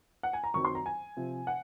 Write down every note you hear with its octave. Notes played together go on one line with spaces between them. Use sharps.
F#5
G#5
A#5
F#2 D#3 F#3 C4 C#6
C6
A#5
G#5
C3 F3 C4
F#5